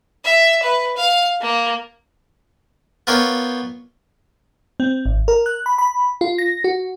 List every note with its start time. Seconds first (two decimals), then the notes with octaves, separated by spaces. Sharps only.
0.25 E5
0.63 B4
0.97 F5
1.42 A#3
3.07 B3 F4 A#4 C#5 D5 G5
4.80 C4
5.06 G#1
5.28 A#4
5.46 F#6
5.66 B5
5.78 B5
6.21 F4
6.38 A#6
6.64 F#4